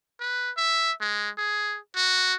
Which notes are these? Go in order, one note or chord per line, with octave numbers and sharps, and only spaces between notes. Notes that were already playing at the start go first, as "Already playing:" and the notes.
B4
E5
G#3
G#4
F#4